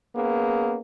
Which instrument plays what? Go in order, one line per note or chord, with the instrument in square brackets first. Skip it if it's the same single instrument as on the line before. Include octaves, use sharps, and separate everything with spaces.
[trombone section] A#3 B3 C#4 G#4